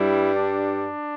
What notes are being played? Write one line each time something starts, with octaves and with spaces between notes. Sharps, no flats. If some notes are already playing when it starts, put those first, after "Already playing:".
Already playing: G2 G3 E4
D4